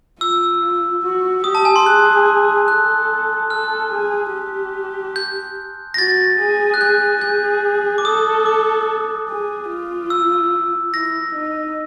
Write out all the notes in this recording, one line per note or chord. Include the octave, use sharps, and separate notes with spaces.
F4 E6
F#4
G4 D#6
A5
G#5
C6
G#4 F#6
A4 F#6
A4 F6
G#4
G4
G6
A#6
F#4 A6
G#4
F#6
G#4 G6
G#4 G6
D6
A4 D#6
D6
G#4
F4
E6
E4 A#6
D#4